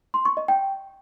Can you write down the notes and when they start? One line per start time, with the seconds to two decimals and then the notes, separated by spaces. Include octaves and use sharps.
0.14 C6
0.25 C#6
0.37 D#5
0.48 G5